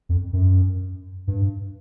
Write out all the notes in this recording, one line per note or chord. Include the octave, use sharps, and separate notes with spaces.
F2
F#2
G2